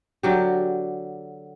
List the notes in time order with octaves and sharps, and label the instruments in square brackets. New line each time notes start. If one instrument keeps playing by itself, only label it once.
[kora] D3 F#3 G4